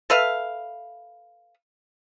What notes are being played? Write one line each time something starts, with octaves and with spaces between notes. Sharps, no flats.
A4 B4 E5 F5